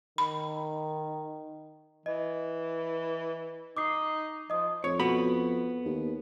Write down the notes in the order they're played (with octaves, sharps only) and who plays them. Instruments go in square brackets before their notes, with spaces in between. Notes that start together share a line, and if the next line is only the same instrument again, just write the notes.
[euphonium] D#3 [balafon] B5
[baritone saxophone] E3 [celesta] D#5
[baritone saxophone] D#4 [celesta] D6 D#6 C7
[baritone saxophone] F3 [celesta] D#5 D#6
[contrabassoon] F2 [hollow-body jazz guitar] C#5
[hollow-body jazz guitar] B3 F#4 B5
[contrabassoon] D#2